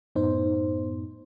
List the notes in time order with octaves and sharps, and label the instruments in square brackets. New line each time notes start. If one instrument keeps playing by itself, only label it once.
[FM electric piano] F#2 A2 B3 D#4 C5